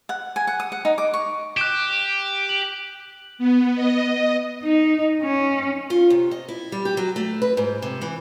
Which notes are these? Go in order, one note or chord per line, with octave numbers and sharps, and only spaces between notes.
F#5
G#5
F#5
D#6
F#5
D#4
D6
C#6
G4 F#6 E7
F#7
B3
D#5
D#4
C#4
F4
C3
D#5
E4
G3
G4
F#3
A3
B4
G#2
C3
E3